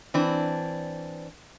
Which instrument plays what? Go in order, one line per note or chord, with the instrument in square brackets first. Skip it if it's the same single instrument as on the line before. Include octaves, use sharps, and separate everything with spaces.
[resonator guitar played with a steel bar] E3 C4 D4